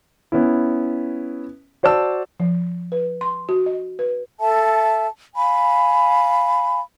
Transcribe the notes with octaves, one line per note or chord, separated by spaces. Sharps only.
B3 C#4 E4
F#4 C5 D5 A5 E6
F3
B4
C6
F#4
D#5
B4
A4 E5 A5
F5 G#5 B5